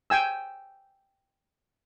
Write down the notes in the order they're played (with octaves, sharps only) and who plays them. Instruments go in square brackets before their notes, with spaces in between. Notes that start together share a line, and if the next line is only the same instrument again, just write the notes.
[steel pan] G5 G#5 E6